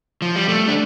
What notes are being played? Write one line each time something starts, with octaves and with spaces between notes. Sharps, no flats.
F3
G3
A3
D4